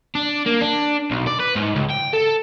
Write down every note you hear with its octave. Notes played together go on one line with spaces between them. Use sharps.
D4
A#3
D4
B1
D5
B4
G#2
C#2
G5
A4